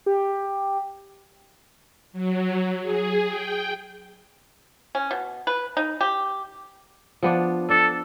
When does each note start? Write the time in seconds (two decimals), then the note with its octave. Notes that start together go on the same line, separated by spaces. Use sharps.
0.06 G4
2.13 F#3
2.81 G#4
3.27 G5
4.95 C#4
5.11 B2
5.47 B4
5.77 D#4
6.01 G4
7.23 F3 B3 D4
7.69 D4 A4